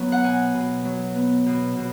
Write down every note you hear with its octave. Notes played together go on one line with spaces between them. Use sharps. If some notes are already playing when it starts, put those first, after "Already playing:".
Already playing: F#3 B3
F#5
B2 G#5
B2
F#3
B3
B2
B2